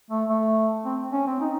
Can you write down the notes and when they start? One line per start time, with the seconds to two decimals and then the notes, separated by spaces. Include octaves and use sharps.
0.10 A3
0.29 A3
0.85 C4
1.13 C#4
1.27 C4
1.41 D#4